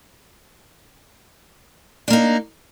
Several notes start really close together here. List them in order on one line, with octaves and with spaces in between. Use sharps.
D4 A#3 D#4